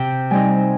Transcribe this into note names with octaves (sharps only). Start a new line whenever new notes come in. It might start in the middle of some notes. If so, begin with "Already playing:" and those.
Already playing: C3 G5
G3 C4 D#4 G#5